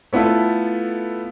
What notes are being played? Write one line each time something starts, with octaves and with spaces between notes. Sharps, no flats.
A3 B3 E4 F4 A4